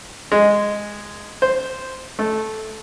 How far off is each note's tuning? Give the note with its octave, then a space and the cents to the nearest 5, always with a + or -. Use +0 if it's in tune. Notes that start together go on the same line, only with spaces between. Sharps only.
G#3 -5
C5 -5
A3 -10